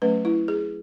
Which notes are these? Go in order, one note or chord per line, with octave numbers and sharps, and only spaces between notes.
F#3 A3 C#4 B4
E4
G#4